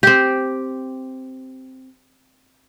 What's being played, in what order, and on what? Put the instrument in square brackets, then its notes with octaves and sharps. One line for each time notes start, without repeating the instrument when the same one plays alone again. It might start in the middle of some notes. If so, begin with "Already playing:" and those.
[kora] C4 G4